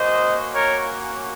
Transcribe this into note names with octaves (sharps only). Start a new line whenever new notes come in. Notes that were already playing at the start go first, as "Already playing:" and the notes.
Already playing: A#3 C#4 F#4 C5 D#5
A#4 C#5